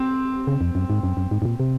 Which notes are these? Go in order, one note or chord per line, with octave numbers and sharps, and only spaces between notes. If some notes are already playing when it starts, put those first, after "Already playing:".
Already playing: C4
C#3
F2
F#2
G#2
F#2
F#2
G#2
G#2
A#2
C3